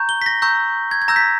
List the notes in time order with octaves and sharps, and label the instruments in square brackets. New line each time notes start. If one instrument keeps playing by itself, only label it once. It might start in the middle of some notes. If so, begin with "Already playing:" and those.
Already playing: [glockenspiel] A#5 C#6 G6
G7
B6
A#6
A#5 C#6 E6 G6
G#6
G#6
A#5 E6 G6 A#6
B6